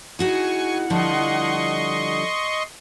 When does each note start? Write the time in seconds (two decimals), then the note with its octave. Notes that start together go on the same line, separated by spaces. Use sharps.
0.19 D#4 E4 F#4 G#4 F#5 G#5 C#6
0.90 D3 F3 G3 D#5 C6 C#6